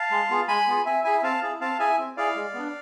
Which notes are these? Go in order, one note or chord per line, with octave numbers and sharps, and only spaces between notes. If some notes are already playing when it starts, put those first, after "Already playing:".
Already playing: F5 A5
G#3
B3 F4 G#4
G#3 G#5 B5
B3 F4 G#4
C4 E5 G#5
E4 G#4 E5 G#5
C4 F5 A5
E4 G#4
C4 F5 A5
E4 G#4 E5 G#5
C4
E4 G#4 D5 F5
G#3
B3 D4